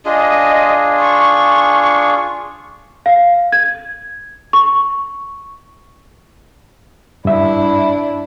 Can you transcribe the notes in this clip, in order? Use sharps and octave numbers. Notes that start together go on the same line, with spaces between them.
D4 F4 G#4 D#5
C#6
F5
G#6
C#6
G2 D4 E4 E5